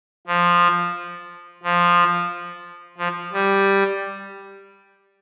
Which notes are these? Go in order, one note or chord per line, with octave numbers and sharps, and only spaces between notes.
F3
F3
F3
G3